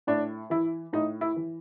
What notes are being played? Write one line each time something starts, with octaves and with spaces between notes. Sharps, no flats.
A2 D4
E3 E4
A2 D#4
E4
E3